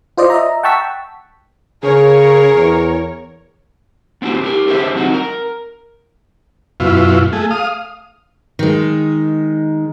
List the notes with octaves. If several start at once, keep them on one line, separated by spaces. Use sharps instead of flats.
F4 C5 D5 D#5
D#5 E5 A#5
F#5 G5 A5 C#6 E6 B6
C#3 G#4 A#4 C#5
E2
B3 C4 D4 F#4 G4
G4 G#4 A#4
D4 G4 G#4 B4 C5 E5
F#3 C4 D#4 F#4
A#4
F#2 B2 E4 F4
A3 G#4
F5 D#6
D#3 G#3